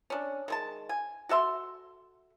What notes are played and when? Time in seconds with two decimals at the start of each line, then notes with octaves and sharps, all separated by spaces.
0.10 C#4 D4
0.48 D#3 G#3 A5
0.89 G#5
1.29 F#4 A4 E5 C6